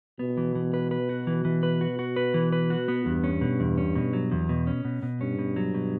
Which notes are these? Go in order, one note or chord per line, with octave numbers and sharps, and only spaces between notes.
B2 B3
E3
E3
B4
B4
F#4
E3
E3
B4
F#4
F#4
B4
E3
B4
F#4
B3
E2 G2
C#4
B2
E2
C#4
B2
F#3
E2
B2
C#4
B2
B2
G2 C#4
B2
F#3
B2